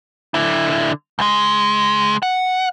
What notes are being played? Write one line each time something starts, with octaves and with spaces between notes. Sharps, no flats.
D3 E4
C#2 G#3
F#5